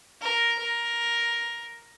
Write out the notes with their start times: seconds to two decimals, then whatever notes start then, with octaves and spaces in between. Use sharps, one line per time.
0.22 A#4
0.59 A#4